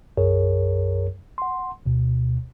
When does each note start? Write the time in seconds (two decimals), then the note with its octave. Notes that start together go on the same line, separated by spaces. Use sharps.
0.17 B1 F#2 G#4 A#4 C#5
1.38 F#5 C6
1.86 D2 B2